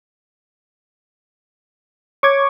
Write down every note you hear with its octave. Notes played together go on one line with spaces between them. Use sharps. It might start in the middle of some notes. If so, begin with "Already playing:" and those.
C#5 C#6 D6 G#6